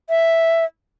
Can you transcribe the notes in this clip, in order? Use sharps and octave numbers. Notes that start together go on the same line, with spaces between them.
E5